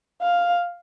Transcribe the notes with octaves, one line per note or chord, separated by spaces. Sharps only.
F5